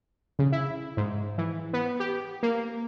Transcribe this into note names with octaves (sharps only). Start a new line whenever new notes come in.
C#3
E4
G#2
E3
B3
G4
A#3